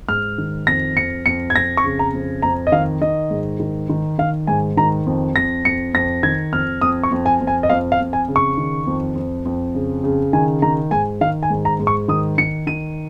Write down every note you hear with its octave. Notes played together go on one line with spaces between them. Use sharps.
G#2 F6
D#3
F2 A#6
F2 C#7
F2 C#7
G#6
F2 A#6
C#6
C#3
A#5
F2
F2 A#5
D#5
D#3 F5
D#3 D#5
G#2
D#3
D#3
D#3 F5
G#2 G#5
D#3 A#5
F2
F2 A#6
F2 C#7
F2 A#6
D#3 G#6
F2 F6
F2 D#6
C#6
F2
G#5
F2
G#5
D#5
F2 F5
F5
F2
G#5
C#3
C#6
D#3
F2
F2
F2
C#3
C#3
D#3 G#5
D#3 A#5
G#2 G#5
D#3 F5
G#5
G#2
A#5
G#2
C#6
D#3 D#6
D#3 C#7
D#3 D#7